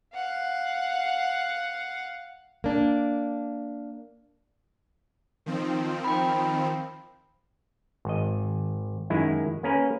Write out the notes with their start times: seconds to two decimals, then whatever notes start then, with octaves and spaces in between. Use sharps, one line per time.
0.15 F5 F#5
2.64 A#3 D4
5.46 D#3 F3 C4
6.04 G5 B5
8.05 G#1 D#5
9.10 F#2 D#3 G#3 E4
9.63 A#3 C#4 G#4 A#4 B4